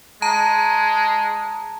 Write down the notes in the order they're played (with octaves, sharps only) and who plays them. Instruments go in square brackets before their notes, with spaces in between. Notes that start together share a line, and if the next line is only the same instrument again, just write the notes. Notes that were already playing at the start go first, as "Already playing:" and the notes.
[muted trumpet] G#3 [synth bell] A5 A#5